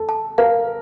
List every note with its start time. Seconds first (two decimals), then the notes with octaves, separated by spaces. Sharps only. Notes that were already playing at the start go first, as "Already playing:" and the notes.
Already playing: A4
0.09 A5
0.38 A#4 F5